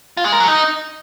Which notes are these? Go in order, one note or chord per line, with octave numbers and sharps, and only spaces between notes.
F4
G#3
A#4
F#3
D#4